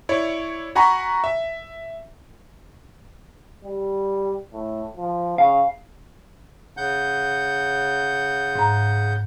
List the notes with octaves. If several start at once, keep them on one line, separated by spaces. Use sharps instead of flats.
E4 C#5 D5
F#4 F#5 G#5 A#5 B5 C#6
E5
G3
A2
F3
C#3 F5
C#3 F#5 G6
G#2 A#5